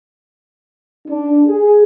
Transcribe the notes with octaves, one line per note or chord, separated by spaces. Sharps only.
D4
G#4